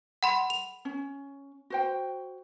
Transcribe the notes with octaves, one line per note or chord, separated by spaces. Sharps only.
F#5 B5 C6
F7
C#4
F#4 C5 G5